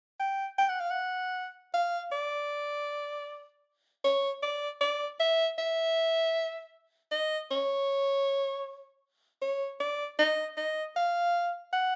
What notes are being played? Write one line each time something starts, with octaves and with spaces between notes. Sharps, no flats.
G5
G5
F#5
F5
F#5
F5
D5
C#5
D5
D5
E5
E5
D#5
C#5
C#5
D5
D#5
D#5
F5
F#5